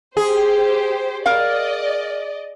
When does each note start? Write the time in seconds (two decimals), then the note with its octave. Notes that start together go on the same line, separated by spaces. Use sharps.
0.17 G4 G#4 C5
1.26 A#4 D5 D#5 F5